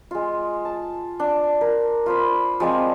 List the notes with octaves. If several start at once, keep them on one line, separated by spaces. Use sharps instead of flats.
G#3 F4
A5
D4
A#4
F4 C5 B5
F3 G#3 C4 D5